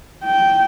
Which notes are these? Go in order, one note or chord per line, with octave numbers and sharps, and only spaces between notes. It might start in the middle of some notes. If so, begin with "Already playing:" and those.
G5